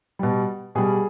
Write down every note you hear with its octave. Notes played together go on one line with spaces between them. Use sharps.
B2 G3
B2 G3 G#4